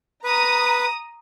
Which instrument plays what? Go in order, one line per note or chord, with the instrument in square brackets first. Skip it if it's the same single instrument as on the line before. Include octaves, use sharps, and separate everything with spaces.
[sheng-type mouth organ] B4 [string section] A#5 D#6